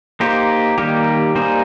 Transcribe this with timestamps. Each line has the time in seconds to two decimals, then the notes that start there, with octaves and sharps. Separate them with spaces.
0.20 A#3 D#4 G4 C5
0.78 D#3 G3 A#3 D#4 G4
1.35 G3 A#3 D#4 G#4 C5